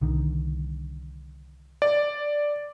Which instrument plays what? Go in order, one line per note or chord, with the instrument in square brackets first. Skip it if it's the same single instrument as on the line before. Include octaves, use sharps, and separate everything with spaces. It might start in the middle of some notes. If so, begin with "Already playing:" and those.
[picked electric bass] C2 D3 D#3
[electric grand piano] D5